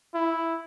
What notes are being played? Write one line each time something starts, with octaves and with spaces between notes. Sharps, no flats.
E4